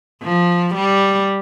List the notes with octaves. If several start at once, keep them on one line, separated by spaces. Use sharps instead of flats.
F3
G3